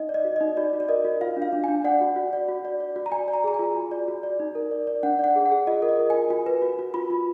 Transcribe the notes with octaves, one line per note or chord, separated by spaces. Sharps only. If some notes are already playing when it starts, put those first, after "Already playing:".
Already playing: D#4 D#5
D5
D#5
F#4
D#4 D#5
F#4 D5
F#4
D5
A#4 D#5
F#4
F4 F5
D4
F5
D4
D4 G#5
D5 F#5
F#4
F#4
D5
F#4
D5
D5
F#4
A#5
D5 G#5
D5
A#5
G#4 A#5
G#5
F4
F#4
D5
F#4
D5
D#4
A#4
D5
D5
D4 F#5
D5 F#5
G#4
F#5
G#4
F4 D#5
A#4
D#5
A#4
F4 G#5
F#4 G#5
B4
F#4
F#4
F4 B5
F4